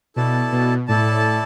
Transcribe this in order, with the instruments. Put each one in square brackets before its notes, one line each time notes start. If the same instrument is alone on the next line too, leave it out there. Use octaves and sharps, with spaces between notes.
[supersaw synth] B2 [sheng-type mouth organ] E4 A4 D5 A5
[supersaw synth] B2
[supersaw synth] A2 [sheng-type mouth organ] E4 A4 D5 A5